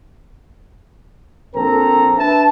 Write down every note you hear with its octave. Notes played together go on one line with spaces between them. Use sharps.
A#1 C4 A4 A#4 A#5
D4 B4 E5 A5